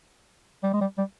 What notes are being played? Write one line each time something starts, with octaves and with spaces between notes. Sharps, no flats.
G3
G#3
G3
G3